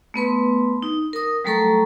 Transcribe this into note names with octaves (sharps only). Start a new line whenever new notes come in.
A3 B3 B4 C6
D#4
A#4 D#6
F#3 G3 A3 A4 A#5 C#6